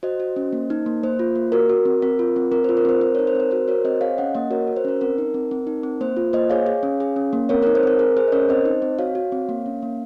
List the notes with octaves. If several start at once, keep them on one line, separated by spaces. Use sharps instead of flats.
F#4 C5 D#5
F#4
C#4
A#3
D#4
A#3
A#3 C5
F4
A#3
F#4 A#4
F#4
C4
C4 A#4
F4
C4
C4 A#4
F4 C5
A#4
C4 C5
C4 C5
D#4 A#4 C#5
C5
C4 A#4
F#4 C5
F#4 A#4 C#5
C4 C5 D#5
G#4 C#5 F5
C#4 D#5 F#5
A#3 D#5 F#5
F#4 A#4 C#5
F#4
C5
C#4 A#4
C4 A#4
D#4
C4
C4
D#4
C4
A#3 C5
F4
A#3 C5 D#5
G#4 C#5 F5
G#4
C#4
G#4
C#4
A#3
C4 A#4 C#5
D#4 A#4 C#5
C5
C4 A#4
G#4 A#4
G#4 C5
D#5
C#4 A#4 C#5
C4 C5 D#5
D#4
C4
F#4 C#5 F5
F#4
C4
A#3
C#4
A#3